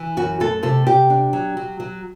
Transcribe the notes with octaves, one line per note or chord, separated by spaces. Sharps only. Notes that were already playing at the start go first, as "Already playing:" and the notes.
Already playing: E3
F#2 F#4
A3 A4
C3 A4
C3 G4
D4
F#3
F#3
F#3